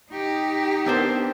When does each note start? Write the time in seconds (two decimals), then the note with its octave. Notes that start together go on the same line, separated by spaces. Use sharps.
0.11 D#4 G4
0.86 B3 C4 D4 A#4 C5